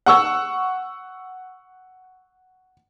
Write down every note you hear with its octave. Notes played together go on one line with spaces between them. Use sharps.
F#5 C#6 E6